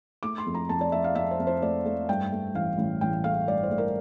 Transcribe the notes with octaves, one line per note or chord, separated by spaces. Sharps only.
A3 D6
C6
F2
A#5
F2 A5
D5
F2 E5
F5
F2 E5
C5
F2
C5
A3 D5
A3
G2 G5
A3
A1 F5
A1
A1 G5
A3 F5
G2 D5
C5
A3
A#4